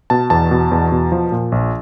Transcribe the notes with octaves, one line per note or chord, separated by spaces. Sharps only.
B2 A5
E2 A5
B2
E2
B2
F3
A#2
A#1